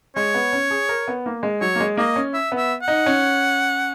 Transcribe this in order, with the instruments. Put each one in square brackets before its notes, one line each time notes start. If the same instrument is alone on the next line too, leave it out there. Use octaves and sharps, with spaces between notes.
[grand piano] G#3 [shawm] C#5
[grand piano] B3
C#4
G#4
A#4
B3
A#3
G#3
[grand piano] F#3 [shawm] C#5
[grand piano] A#3
G#3
[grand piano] A#3 [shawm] D#5
[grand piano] C#4
[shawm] E5
[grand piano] B3
[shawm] E5
F#5
[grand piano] D#4
C#4